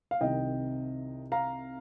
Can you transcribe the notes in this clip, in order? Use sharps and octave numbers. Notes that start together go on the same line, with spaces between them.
F5
C2 C3 D#3 D#5 G5
F5 A#5